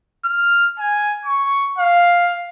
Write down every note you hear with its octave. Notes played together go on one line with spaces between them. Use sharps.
F6
G#5
C#6
F5